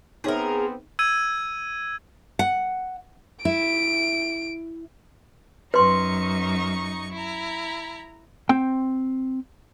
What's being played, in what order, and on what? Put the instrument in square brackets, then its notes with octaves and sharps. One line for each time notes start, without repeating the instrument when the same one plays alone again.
[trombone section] B3 C4 [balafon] D#4 C#5 E5 [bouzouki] G#4 A#4
[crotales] E6 G#6 D#7
[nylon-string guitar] F#5
[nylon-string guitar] E4 [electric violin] D7
[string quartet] F#2 D#4 C#6 [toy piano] B4 C6
[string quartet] E4 A#5
[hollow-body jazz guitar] C4 G5